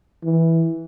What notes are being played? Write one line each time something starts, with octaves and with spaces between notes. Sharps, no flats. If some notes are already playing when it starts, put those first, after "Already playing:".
E3